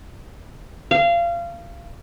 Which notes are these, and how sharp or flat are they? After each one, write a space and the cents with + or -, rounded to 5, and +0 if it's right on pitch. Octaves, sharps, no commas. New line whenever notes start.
F5 -25